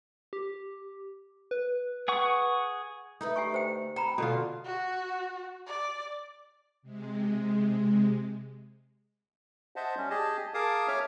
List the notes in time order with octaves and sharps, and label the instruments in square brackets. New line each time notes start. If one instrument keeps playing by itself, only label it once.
[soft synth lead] G4
B4
[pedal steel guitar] G#4 F#5 C#6
[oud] D2 A3 B4 [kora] D#4
[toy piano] G4 G#5 C#6
G4 C5 G5
[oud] C4 [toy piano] G5 A#5 B5
[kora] B2 D3 F4
[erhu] F#4
D5
[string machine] C3 G#3
[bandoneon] C5 D#5 E5 F#5 A5
G3 C#4
G4 G#4 D#5 A5
G#4 A#4 F5 A5 D6 D#6
C#5 E5 D6 F6